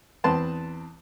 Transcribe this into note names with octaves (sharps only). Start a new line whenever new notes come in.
E2 C4 B4 A5 C6